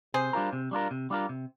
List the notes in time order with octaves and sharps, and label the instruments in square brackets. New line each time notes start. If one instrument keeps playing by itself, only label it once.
[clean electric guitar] C3 [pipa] G#4 C5
[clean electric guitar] G3 D4 F4 A#4
C3
G3 D4 F4 A#4
C3
G3 D4 F4 A#4
C3